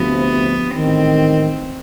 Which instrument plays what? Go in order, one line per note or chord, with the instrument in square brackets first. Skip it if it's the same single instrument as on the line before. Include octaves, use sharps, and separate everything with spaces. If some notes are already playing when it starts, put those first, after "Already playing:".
Already playing: [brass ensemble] D2 C3 F3 [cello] B3
[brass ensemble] A1 G#2 D#3 [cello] C4